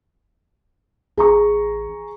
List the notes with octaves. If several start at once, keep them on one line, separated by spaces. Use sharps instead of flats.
A1 G#4 A#5 C#6